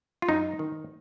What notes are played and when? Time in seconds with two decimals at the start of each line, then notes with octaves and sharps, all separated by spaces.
0.22 F4
0.28 F#2 D#4
0.59 D#3